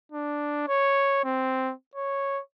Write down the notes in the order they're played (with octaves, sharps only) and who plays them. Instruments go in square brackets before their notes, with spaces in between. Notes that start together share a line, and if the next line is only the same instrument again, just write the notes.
[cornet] D4
C#5
C4
C#5